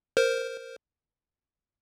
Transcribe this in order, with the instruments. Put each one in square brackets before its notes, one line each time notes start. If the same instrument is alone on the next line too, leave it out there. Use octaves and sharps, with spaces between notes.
[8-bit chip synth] A#4 C5